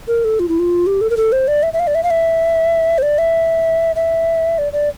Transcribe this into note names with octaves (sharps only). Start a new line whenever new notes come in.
A#4
A4
F4
E4
F4
G4
A4
A#4
A4
C5
D5
E5
E5
F5
D5
E5
F5
E5
C5
D5
E5
E5
D5
D5